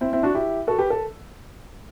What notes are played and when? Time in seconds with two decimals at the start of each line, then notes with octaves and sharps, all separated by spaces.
0.01 C4 E4
0.13 C4 E4
0.23 D4 F#4
0.35 E4 G4
0.67 F#4 A4
0.79 G4 B4
0.90 A4